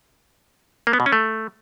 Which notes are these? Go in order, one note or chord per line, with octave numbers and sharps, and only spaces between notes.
A#3
B3
B2
C#4
A3